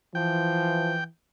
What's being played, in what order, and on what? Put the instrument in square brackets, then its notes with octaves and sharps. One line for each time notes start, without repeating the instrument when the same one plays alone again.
[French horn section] E3 [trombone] F3 [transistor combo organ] G5